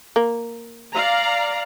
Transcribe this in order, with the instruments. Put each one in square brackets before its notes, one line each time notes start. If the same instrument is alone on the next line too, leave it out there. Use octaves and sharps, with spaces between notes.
[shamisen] A#3
[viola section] D5 F5 A#5